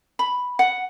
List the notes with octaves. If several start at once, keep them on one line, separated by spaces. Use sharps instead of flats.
B5
F#5